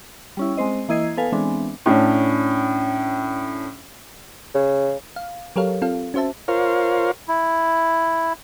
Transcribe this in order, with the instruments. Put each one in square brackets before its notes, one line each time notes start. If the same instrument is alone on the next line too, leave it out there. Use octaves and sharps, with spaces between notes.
[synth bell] G3 C#4 E4
G#3 C4 C5 D#5
E3 A#3 E4 D#5 G#6 C7
B3 A4 B4 F5 G#5
E3 G#3 B3 C4 D4
[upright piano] A2 C#4 D4
[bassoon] C#3
[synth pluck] F5
F#3 G4 A4 A#4 C#5 F5
C4 F4 A4 F5
C#4 F#4 C5 E5 A5
[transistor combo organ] F4 A#4 C5 C#5 F5
[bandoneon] E4